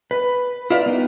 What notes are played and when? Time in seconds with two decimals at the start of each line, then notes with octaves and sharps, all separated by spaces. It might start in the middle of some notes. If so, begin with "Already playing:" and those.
0.11 B4
0.70 E4 F4 A#4 D5 E5 F5
0.86 B3 D#4 G4